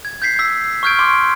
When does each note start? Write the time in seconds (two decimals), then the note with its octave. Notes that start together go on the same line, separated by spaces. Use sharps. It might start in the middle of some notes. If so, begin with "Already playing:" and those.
0.05 G#6
0.22 G6 G#6 B6 C7
0.39 E6 B6
0.83 C#6 E6 F6 G6 G#6 D7
0.99 C6 D6